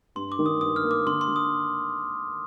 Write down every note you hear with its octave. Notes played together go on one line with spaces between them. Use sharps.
G2 C6
D6
D#3
D#6
G2 D#6
F6
A#3
D6
D3 C6
C6
D3
D#6